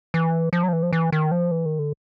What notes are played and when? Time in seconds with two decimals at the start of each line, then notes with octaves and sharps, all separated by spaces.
0.14 E3
0.53 F3
0.63 F#3
0.68 F3
0.73 E3
0.83 F3
0.93 E3
1.12 D#3
1.32 F3
1.51 E3
1.66 D#3
1.79 D3